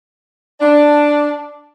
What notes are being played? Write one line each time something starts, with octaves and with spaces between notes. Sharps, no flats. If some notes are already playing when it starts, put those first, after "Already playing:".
D4